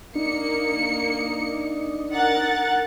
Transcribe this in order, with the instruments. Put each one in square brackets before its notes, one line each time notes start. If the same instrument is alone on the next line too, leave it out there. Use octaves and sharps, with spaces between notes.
[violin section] A#3 C#7 [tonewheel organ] D4 D#4
[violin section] A#4 F#5 A6